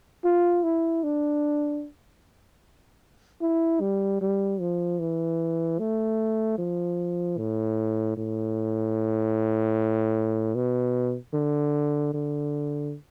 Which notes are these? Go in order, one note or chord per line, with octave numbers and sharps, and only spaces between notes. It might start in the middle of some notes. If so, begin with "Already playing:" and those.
F4
E4
D4
E4
G3
G3
F3
E3
A3
F3
A2
A2
B2
D3
D3